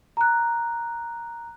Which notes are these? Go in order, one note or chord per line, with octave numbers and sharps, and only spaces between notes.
A#5 F#6